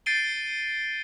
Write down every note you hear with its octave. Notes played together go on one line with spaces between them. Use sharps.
G6 A6 C7 D7 D#7 G7